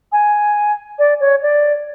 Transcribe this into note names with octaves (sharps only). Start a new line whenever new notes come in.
G#5
D5
C#5
D5